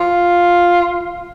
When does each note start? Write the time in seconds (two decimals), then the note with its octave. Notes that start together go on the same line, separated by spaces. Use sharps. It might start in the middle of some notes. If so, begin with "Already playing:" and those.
0.01 F4